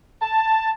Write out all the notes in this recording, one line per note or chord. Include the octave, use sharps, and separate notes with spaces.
A5